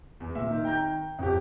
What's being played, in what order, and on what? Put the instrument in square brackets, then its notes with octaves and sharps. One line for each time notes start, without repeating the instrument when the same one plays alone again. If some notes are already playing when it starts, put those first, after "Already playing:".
[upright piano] E2
[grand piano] A#2 [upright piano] E5
[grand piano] D#3
[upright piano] G5 A#5 G6
[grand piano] F2 G4